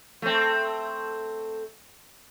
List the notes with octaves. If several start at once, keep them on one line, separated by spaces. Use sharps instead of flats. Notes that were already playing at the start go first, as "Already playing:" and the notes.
A3 C4